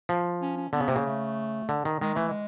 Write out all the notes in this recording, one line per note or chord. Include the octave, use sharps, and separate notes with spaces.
F3
C#4
C#4
D3 B3
C#3
C3 A#3
C#3
A3
D3
D#3
D#3 G#3
E3 A3
G#3